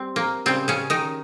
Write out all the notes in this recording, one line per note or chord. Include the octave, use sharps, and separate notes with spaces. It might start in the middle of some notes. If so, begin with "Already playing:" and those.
Already playing: G3 C4
A#3
C#3 G3 C4
C#3 C#4
D#3 D#4